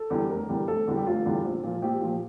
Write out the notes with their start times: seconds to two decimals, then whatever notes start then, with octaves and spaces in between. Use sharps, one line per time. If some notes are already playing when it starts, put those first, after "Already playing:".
Already playing: A4
0.10 E2 D3 G3
0.29 F1 A#4
0.49 E2 D3 G3
0.67 F1 A4
0.87 E2 D3 G3
0.97 G4
1.06 F1 F4
1.26 E2 D3 G3
1.45 A#1
1.63 A#2 F3
1.82 A#1 G4
2.01 A#2 F3